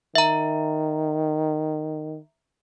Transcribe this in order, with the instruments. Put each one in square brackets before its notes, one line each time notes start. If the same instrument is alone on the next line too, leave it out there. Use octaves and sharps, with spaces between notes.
[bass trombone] D#3 [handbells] E5 A#5